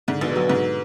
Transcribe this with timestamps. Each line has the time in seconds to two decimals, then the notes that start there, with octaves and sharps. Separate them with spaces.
0.08 G#2 D3
0.21 A#1 B2
0.35 F#3
0.50 G#2